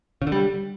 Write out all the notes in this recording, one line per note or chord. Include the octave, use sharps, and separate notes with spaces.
C#3
D3
G3